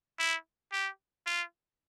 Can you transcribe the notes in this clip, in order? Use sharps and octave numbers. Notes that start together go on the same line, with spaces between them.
E4
G4
F4